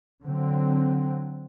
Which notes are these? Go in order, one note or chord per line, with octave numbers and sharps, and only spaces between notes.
D3 F#3 C4